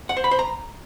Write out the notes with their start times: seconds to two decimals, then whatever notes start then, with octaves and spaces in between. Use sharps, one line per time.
0.09 F#5
0.17 C5
0.24 B5
0.31 C5
0.39 A#5